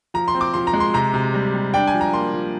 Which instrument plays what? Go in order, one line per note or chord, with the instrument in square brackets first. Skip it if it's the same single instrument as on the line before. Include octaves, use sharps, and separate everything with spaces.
[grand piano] F3 A#5
C6
C4
D6
F3 C6
A#5
G#3
C6
C3 A#5
C3
G3
G3
D4 G5
G#5
F3
A#5
A#3 C6
F3